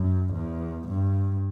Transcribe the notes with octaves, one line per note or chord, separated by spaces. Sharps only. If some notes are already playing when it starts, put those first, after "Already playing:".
Already playing: F#2
E2
G2